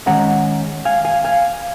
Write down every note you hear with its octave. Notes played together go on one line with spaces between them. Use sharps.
D#3 G#3 C#4 F#5 A#5
F5 G#5
F5 G#5
F5 G#5